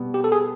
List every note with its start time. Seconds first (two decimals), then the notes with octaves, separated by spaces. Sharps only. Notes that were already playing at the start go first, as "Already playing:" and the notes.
Already playing: B2 G3 B3
0.14 G4
0.24 A4
0.32 G#4